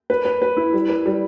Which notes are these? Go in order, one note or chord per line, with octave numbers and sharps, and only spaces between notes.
B4
B4
B4
E4
G3
B4
G3